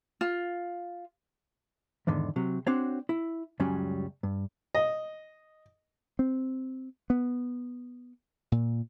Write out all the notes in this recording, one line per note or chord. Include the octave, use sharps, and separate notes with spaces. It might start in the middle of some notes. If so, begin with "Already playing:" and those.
F4
E2 G#2 D3 D#3
C3 F#3
C4 D4 F#4 C5 C#5
E4
C#2 F#2 F#3 G3 C#4
G2
D#5
C4
B3
A#2